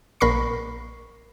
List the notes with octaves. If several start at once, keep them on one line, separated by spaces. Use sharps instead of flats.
A#1 A#4 B5 C#6 C7